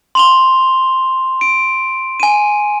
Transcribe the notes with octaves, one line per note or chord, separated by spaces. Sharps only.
C6 F7 G7
D7
G#5 D#7